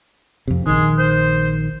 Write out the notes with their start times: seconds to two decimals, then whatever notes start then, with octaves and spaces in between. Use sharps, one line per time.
0.48 F2 C3
0.67 A#1 D#3 G#3
0.98 C5